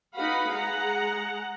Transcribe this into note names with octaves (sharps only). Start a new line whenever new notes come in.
D#4 F#4 B4 F5 F#5 B5
G#3 G#4 F#5 A#5